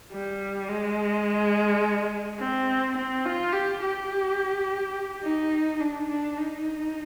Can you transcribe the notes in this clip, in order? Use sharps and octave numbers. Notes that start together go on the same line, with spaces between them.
G3
G#3
C4
C4
F4
G4
G4
D#4
D4
D4
D#4